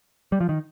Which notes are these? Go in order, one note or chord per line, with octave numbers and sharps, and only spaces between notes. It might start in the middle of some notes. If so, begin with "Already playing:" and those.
G3
F3
D#3